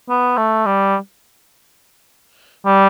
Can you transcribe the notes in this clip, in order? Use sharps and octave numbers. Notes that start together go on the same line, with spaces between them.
B3
A3
G3
G3